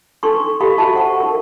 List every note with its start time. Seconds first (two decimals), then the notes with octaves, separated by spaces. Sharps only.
0.23 D4 D#4 A4 B4 C6 C#6
0.60 G4 A4 D#5 F5 B5 C#6
0.78 F#4 D#5 E5 A5
0.94 C5 F#5 C#6
1.20 D#4 A#4